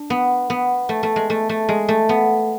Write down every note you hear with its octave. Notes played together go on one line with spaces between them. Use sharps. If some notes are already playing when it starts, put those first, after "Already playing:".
Already playing: D4
B3
B3
A3
A3
G#3
A3
A3
G#3
A3
B3